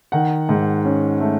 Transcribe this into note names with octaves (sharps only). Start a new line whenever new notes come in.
D#3 F#5
G#2
C#4
A3